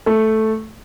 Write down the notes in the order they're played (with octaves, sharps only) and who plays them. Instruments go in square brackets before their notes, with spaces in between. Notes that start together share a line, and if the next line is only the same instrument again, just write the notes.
[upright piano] A3 A4